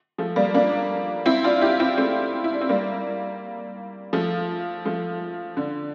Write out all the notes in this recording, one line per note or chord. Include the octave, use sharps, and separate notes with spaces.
F3 A3
G3 A#3
A#3 D4
C4 E4
D4 F4
E4 G4
C4 E4
A3 C4
E4
D4
C4
G3 A#3
F3 A3
F3 A3
D3